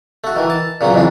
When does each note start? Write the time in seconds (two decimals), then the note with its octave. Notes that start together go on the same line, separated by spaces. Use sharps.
0.24 A3 F#4
0.36 D#3 E3
0.50 A5
0.81 A#2 C#3 F#3 B3
0.94 A1 F2 G#2 D4